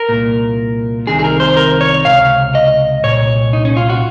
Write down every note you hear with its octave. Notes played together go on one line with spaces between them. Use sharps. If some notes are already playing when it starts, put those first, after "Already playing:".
Already playing: A#4
C2 A#2
C2 C3 D#3 G#4
G#4
A#4
C5
A#4
C#5
C#2 C3 F5
D#5
C2 A#2 C#5
D#4
C#4
F4
F#4